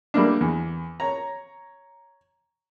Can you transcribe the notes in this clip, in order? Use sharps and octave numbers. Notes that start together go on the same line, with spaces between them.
G3 A3 A#3 D4
E2
C#5 A#5